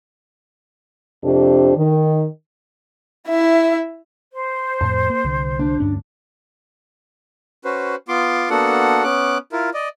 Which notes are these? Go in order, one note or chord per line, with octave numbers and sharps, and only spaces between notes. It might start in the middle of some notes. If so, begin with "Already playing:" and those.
F2 C3 D4 G4 C5
D#3
E4 E5
C5
F2 A2 A5
A#3
C2 D3
D4
D2 G2 C#4
C#4 F#4 B4 C5
B3 F4 C6 D6
A#3 B3 D4 F#4 A4 F#5
B3 C#4 D6 F#6
E4 F4 A#4
D5 D#5